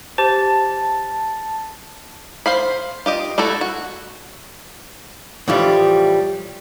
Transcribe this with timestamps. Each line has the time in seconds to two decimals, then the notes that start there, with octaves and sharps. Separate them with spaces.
0.18 G4 C5 A5
2.46 C5 F5 B5
3.06 F4 G4 D#5
3.38 A3 E4 F#4 A4
3.61 F#4
5.48 A2 E3 F3 G3